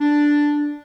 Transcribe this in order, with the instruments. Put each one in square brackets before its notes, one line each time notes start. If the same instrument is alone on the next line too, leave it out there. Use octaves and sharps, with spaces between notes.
[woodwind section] D4